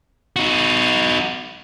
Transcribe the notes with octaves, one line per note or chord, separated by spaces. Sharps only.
D#4 F#4